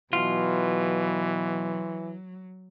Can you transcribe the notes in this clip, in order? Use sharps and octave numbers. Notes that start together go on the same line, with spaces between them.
B2 E3 F#3 F4